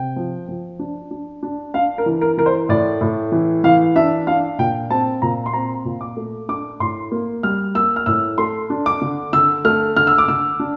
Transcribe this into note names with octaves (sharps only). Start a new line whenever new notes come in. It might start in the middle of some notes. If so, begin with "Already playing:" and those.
Already playing: C3 G5
F3
F3
D4
D4
D4
D4 F5
A#4
E3
A#4
E3 A#4
C5
A2 D5
A2
E3
E3 F5
D4 E5
D4 F5
A#2 G5
C4 A5
A#2 A#5
C6
C4 A#5
A#2
D6
A3
D4 D6
A2 C6
A#3
G3 F6
A#3 E6
F6
A2 E6
A3 C6
D4
D6
D3
D3 E6
A3 F6
D3 F6
E6
D6
D3 E6
D4